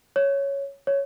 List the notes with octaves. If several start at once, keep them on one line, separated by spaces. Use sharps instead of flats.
C#5
C#5